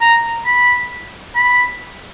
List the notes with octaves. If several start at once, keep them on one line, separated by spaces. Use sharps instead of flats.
A#5
B5
B5